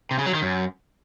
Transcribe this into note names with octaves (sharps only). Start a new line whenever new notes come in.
C3
C#3
F#3
D#3
F#2